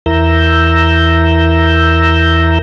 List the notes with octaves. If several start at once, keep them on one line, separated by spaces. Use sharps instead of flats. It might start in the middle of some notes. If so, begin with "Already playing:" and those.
E2 E4 A#4 A#5 E6 G6